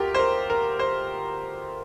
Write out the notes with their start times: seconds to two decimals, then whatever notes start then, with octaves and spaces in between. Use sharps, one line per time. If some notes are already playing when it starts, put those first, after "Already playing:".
Already playing: D2 F4 G4 A#4
0.14 C5
0.19 A#4
0.50 A#4
0.79 C5